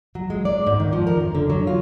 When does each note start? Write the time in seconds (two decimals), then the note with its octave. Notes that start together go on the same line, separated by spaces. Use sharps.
0.15 F#3
0.30 G#3
0.45 D5
0.67 G#2
0.80 D#3
0.93 F3
1.07 A#4
1.20 F#2
1.35 D3
1.50 F#3
1.67 F4